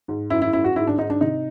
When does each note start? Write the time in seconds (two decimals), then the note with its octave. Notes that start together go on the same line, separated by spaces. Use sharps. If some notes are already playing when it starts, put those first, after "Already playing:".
0.08 G#2
0.30 F#2 E4
0.42 E4
0.53 F#2 E4
0.64 F#4
0.76 G#2 E4
0.87 D4
0.98 G#2 D#4
1.10 D4
1.21 C3 D#4